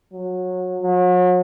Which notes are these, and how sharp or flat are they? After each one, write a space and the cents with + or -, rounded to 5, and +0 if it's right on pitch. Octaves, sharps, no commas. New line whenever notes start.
F#3 -25
F#3 -40